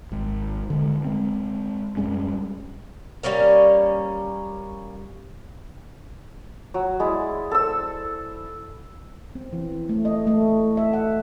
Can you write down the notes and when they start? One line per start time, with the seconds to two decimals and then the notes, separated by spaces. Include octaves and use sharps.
0.12 G#1 G#2
0.70 D3 G#3
1.05 G#3 C4
1.97 F#2 G3 G#3 C#4
3.23 G3 A#3 C#4 A#4
6.74 F#3
7.00 G#3 E4 D5
7.51 A4 C5 E6
9.35 C4
9.53 E3
9.89 A3
10.05 D#5
10.27 A3
10.77 E5
10.93 F#5